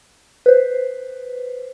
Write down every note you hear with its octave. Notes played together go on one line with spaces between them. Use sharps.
B4 C5